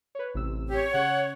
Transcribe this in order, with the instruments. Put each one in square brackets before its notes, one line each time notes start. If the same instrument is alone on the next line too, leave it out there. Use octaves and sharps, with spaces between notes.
[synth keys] B4 C#5
A1 C3 E6
[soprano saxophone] G4 [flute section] C#5
[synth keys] C#3 [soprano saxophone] F#5